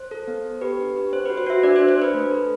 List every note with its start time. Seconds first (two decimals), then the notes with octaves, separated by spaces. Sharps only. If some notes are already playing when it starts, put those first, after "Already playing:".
Already playing: C5
0.11 A4
0.28 B3
0.45 A4
0.61 G4 B4
0.79 D4
0.96 G4
1.12 C4 C5
1.25 F#4 B4
1.38 C5
1.46 F#4 E5
1.63 D4 D5
1.76 C5
1.80 D4
1.89 C5
1.97 D4 B4
2.14 A3
2.31 A4